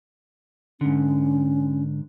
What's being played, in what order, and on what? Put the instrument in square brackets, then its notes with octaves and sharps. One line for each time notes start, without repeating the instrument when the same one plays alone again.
[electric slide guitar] G#2 D3 [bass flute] C#4